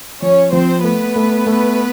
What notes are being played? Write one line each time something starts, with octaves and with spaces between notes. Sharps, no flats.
F3 C#4 C#5
F3 C4 C5
A3 B3 B4
A3
A3